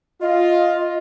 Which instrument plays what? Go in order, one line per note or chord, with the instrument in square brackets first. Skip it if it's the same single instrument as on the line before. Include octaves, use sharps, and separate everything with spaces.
[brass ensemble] F4 [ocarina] D#5